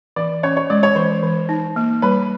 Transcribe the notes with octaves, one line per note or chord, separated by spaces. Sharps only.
E3 D5
C#4 C#5
C#5
G#3 D5
C#5
E3 C5
E3
D#4
A#3
G3 B4